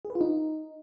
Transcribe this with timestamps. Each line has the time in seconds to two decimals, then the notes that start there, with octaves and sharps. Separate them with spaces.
0.05 G#4
0.10 B4
0.15 F4
0.21 D#4